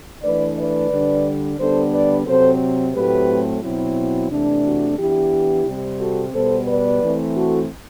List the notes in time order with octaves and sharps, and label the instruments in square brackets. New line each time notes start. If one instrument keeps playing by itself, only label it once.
[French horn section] E3 A3 D4 B4 D5
B4 D5
D3 G3 D4
D3 G3 B3 D4 A4 C5
B4 D5
C3 F#3 C4 A4 C5
A2 F#3 A3 C4 G4 B4
B2 F#3 C4 E4
C3 E3 A3 D4
F#4
E3 B3 D4 E4 G4
C3 G3 C4
F#4 A4
B2 G3 B3 A4 C5
B4 D5
E3 A3 C4
F#4 A4